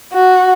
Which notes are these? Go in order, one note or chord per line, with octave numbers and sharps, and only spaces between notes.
F#4